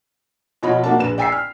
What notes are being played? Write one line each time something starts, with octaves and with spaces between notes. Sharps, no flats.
B2 F3 C#5 D#5 B5
A#3 D4 F#4 A#4 D5 A5
A#1 B4 E7
D5 G5 G#5 E6 B6 C7
F6